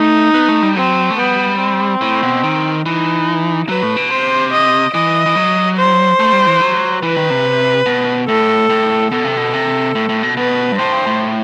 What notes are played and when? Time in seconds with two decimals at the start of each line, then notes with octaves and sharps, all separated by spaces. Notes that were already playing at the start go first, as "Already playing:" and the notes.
Already playing: A3 D#4
0.34 B3
0.49 A3
0.63 G3
0.76 F#3 C4
1.10 A3
1.19 G3 B3
1.60 C4
2.01 A2
2.23 B2
2.43 D#3
2.85 E3 D#4
3.68 F#3 B4
3.83 A2
3.96 B2
4.10 C3 C5
4.53 D#5
4.94 E3 D#5
5.26 E3
5.36 F#3
5.77 C5
6.20 A3
6.33 G3
6.47 E3
6.61 F#3
7.03 E3 B4
7.17 D#3
7.30 C3
7.86 B2
8.28 A2 A4
8.70 A2
9.11 B2 A4
9.24 C3
9.37 B2
9.53 C3
9.95 A2
10.09 A2
10.23 B2
10.37 B2 B4
10.72 G2
10.79 A2 C5
10.92 G2
11.07 A2